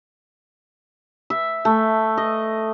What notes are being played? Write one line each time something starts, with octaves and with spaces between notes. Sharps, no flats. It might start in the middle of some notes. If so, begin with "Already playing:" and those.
E5
A3
D#5